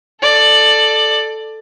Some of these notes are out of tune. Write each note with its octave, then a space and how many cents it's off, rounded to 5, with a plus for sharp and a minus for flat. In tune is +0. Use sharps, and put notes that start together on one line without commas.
A4 +0 D5 +15